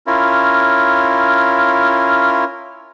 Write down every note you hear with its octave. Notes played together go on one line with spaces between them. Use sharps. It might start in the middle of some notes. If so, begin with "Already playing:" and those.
C#4 E4 F4 A#4